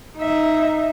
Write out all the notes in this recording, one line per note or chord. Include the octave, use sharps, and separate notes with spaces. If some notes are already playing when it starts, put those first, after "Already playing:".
D#4 E5